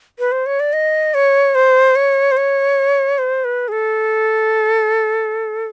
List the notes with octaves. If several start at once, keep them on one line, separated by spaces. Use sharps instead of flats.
B4
C5
C#5
D5
D#5
C#5
C5
C#5
C5
C#5
C5
B4
G#4
A4